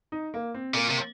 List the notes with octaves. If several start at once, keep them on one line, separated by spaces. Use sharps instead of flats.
D#4
A#3
C4
A#2 A#3
C3